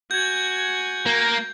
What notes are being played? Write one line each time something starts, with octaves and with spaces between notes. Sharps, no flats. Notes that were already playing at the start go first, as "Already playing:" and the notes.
F#4 G#5 G6 G#6
A#3